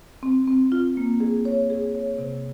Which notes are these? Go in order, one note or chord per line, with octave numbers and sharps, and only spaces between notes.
C4
C4
F4
A#3
G#4
C#5
G#4
C#5
C3